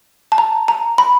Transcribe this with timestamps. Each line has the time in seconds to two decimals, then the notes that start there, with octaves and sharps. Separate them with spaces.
0.32 A5
0.38 A#5
0.68 A#5
0.98 B5